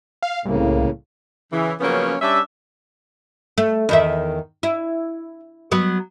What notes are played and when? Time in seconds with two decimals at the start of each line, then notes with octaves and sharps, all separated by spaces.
0.23 F5
0.45 C2 A2 C#3 A#3
1.53 C#3 E3
1.80 C#3 F3 F#3 A#3 B3 C#4
2.21 G3 C#4 D4 E5
3.58 A3
3.89 E2 D#3 E5
4.63 E4
5.72 F#3 B3